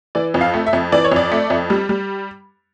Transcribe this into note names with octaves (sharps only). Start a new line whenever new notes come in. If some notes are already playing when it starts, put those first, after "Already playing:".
E3 D5
F2
F5
A3
E5
F2
E3 D5
C#5
F2 D5
A3
F2
G3
G3